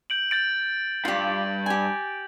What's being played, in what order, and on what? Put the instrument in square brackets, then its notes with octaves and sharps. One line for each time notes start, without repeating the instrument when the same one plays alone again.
[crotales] G6 D7 F#7
G6 A6 D7
[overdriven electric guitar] G2 [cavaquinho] F4 G4
[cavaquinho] G4 G#5